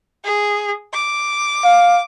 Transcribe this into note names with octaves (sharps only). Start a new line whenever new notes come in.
G#4
D6
F5